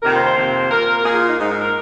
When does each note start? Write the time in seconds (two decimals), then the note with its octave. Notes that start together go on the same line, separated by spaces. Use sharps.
0.02 F2 C3 D#3 A#3 A#4
0.13 C5
0.24 C5
0.36 F2 C3 D#3 A#3
0.70 A#2 A#3 A#4
1.04 A#2 A#3 G#4
1.15 F4
1.26 D#4
1.38 G#2 G#3 D#4
1.49 A#4
1.61 A#4